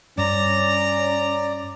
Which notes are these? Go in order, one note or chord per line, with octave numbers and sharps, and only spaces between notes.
G2 C#4 D5 A#5